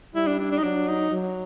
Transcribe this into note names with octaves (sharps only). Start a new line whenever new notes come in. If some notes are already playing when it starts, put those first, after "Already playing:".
G3 E4
D4
D4
D4
D#4
F#3 D4
D#4
F#3